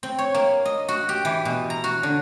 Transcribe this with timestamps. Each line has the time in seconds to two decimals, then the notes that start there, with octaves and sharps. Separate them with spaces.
0.03 C4
0.18 C#5
0.34 A#3
0.65 D#5
0.88 F#4
1.09 G4
1.25 E3
1.45 B2
1.70 A#5
1.84 F#4
2.03 D3